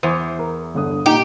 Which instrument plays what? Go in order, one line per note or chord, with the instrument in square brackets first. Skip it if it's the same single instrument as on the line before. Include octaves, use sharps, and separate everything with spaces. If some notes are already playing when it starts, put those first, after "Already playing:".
[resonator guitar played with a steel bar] E2 [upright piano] C5
[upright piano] A#4
G1 D3 D#6
[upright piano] A#2 [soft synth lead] D#4 [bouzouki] G4